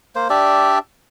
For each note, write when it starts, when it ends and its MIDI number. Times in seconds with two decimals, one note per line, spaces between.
0.15 0.28 58
0.15 0.28 72
0.30 0.78 62
0.30 0.78 67
0.30 0.78 74
0.30 0.78 76